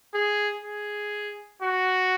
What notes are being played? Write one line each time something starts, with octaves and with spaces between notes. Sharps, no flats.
G#4
G#4
F#4